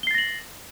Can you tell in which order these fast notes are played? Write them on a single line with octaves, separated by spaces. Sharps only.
G7 C7 A6 A#6 F#7